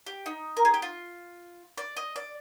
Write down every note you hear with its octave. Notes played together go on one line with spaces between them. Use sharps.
G4
D#4
A#4
G#4
G4
F4
D5
D#5
D5